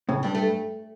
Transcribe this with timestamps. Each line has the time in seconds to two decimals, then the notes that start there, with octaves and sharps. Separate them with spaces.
0.09 A2 C#3
0.23 G2 G3
0.35 A3